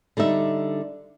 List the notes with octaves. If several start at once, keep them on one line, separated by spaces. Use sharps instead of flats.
D3 G3 D#4 E5